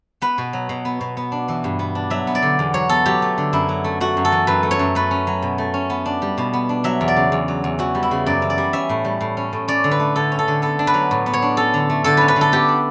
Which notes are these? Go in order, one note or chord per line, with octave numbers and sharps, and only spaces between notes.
B3 B4
B2
F#3
B2
B3
B2
B3
D4
E3
G2
B3
D4
F#3 E5
B3
D5
D3
E2
F#3 C#5
B3 A4
F#3 G4
A3
D3
F#2 E4
F#3
A3
A3 F#4
F#2
A4
E3
F#2 B4
A3
C#5
F#2
A3 B4
C#4
F#3
B2
A3
C#4
B3
D4
G3
B2
B3
D4
F#3 E5
E2
D5
C#3
E2
F#3
E2
E3 F#4
G3
E4
C#3
F#2 D5
E3
D5
G3
C#4 E5
A2
G3
A2
C#4
A2
C#4 D5
D3
B4
A3
D3 A4
C#4
A4
D3
B3 A4
D4
B4
F#3
A2
B3
C#5
D4
C#4 A4
D3
A3
D3 A4
C#4 B4
B4
D3 A4
B3 G4
D4